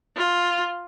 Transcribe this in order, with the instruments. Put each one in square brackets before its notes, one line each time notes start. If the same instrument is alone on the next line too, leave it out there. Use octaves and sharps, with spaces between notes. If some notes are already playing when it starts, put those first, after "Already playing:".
[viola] F4